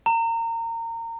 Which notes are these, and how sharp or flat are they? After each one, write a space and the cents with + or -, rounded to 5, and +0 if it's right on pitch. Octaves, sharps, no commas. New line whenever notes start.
A#5 -25